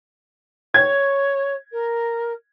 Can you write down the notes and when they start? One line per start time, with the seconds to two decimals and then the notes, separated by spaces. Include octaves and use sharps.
0.74 C#5 G#6
1.72 A#4